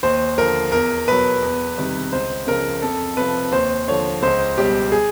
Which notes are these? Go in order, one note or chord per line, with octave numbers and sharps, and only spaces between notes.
D#2 C5
D3 F3 A#4
E2 A#4
B2 F#3 B4
E2
C3 D#3 G3
C#2 C5
C#3 F3 A#4
F2 A4
C3 F3 B4
D#2 C5
D3 F3 C#5
C#2 C5
B2 G3 G4
G#4